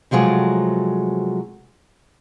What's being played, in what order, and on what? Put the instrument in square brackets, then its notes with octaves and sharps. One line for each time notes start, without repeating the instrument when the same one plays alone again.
[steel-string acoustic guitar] C3 F3 F#3 G#3 A3